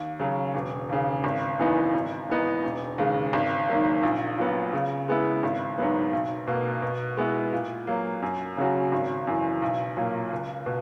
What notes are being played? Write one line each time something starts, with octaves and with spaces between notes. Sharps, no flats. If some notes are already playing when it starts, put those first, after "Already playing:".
Already playing: D#2
C#3 F#3
E1
D#2 C#3
G#1
F#2 E3 B3 D#4
G#1
G#2 E3 B3 D#4
E1
D#2 C#3 G#3
G#1
G#2 D#3 F#3 A#3
A#1
A#2 F#3 B3
C#3
G#3 B3 E4
G#1
G#2 F#3 B3
B1
B2 A#3
B2
G#3 B3 E4
A#2
F#3 A#3
F#2
C#3 F#3 C#4 F#4
G#1
F#2 E3
B1
A#2 F#3 A#3
C#2
B2